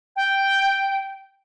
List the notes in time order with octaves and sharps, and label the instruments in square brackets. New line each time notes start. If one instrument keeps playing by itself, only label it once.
[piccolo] G5